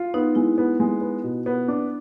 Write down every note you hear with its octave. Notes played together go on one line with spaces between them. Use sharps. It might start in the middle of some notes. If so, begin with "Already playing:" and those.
Already playing: F4
B3 D#4
G#3 E4
B3
G#3
B3
B2
B3
D4